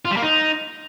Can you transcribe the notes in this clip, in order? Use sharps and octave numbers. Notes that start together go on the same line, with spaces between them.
F4
G3
A#3
D#4